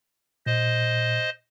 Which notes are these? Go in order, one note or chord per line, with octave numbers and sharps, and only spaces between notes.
A#2 C5 D#5